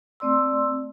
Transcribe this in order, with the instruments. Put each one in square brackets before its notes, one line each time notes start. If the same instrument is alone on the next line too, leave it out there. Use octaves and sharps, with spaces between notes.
[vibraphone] A3 C4 D5 C6 E6